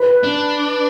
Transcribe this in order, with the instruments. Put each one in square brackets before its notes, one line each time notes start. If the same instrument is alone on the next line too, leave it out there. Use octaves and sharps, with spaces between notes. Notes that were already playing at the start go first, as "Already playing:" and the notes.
Already playing: [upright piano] B4
[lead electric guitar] D4